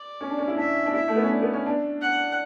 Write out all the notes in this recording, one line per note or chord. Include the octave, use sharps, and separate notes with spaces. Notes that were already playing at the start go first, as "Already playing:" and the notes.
Already playing: D5
C#4
D4
C#4
E4
D4 E5
D4
E4 E5
A3
B3
C#4
D4
B3
C#4
D4
F#5